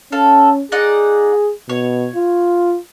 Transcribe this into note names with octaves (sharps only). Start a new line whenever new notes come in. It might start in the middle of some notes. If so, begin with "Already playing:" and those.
C#4 A4 F5
D#4 G#4 D5 F#5
B2 C#5
F4